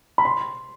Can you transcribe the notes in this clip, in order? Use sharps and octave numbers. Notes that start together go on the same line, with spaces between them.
B5
C6